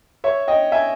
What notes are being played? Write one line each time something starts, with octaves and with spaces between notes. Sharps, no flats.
C#5 E5
D#5 G5
E5 G#5